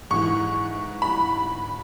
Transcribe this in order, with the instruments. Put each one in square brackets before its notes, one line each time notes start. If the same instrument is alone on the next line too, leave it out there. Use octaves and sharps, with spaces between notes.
[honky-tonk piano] G#2 E3 C#6
B5